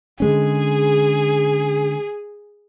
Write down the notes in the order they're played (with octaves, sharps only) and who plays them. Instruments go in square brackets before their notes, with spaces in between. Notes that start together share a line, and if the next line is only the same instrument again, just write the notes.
[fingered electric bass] D3 G#3 C#4 [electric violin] G#4